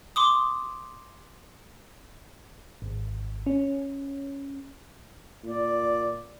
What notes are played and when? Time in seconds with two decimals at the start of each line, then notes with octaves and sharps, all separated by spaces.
0.16 C6 D6 D#6
2.82 G#1
3.46 C#4
5.44 A#2 D5